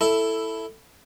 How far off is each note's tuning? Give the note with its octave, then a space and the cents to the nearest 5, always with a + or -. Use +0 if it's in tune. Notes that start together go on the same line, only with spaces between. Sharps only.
E4 +0 A4 +5